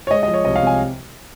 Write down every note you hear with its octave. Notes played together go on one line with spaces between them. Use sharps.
C#5
G#3 D#5
F3 D#5
C#5
C2 D#5
F5
C3
G#5